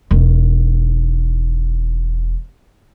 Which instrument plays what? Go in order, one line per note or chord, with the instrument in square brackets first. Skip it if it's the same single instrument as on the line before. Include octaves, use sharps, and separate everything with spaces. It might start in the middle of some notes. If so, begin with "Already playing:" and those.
[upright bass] E1 D#3